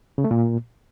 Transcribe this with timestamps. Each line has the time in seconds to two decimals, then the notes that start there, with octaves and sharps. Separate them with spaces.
0.18 C#3
0.24 A3
0.31 A#2